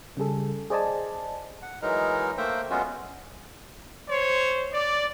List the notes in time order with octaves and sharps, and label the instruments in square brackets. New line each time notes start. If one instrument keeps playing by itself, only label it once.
[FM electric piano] C#3 G3 G#4 A4
G#4 C5 D5 D#5 G#5 A5
[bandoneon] F#5
E3 F#3 G#3 D#4 A#4
A3 A#3 C5 E5 G5
F#3 G#3 B3 C#4 F4 F#4
[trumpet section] C5 C#5
D5